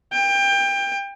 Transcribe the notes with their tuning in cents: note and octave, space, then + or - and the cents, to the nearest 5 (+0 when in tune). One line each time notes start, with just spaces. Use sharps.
G5 +25